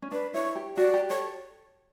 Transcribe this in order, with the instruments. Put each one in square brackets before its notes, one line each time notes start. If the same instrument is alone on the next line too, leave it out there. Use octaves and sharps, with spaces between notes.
[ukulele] C#4
[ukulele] D4 [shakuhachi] B4
[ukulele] E4 [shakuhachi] C#5
[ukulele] G4
[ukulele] F#4 [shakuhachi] D5
[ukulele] G4
[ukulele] A4 [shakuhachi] C#5